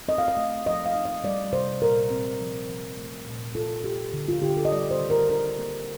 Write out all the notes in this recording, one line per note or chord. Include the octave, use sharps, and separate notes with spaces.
C4 D#5
F5
D#5
A3
F3 D#5
F5
D#4
D#5
G3 D5
C3 C5
A#2 A#4
C4
F3
F3
A3
A#2
F4 A4
F4 G4
D3
F4
D3 G4
A4
D#5
G3 D5
C5
D#3
A#4
D4 A#4
A#3